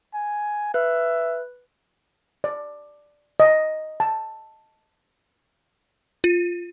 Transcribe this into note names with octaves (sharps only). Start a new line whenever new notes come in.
G#5
B4 E5 F#6
D5
D#5
A5
F4